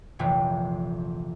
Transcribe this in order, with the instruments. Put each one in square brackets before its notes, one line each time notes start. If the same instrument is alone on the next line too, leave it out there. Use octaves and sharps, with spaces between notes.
[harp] F1 A#1 E3 B3 G5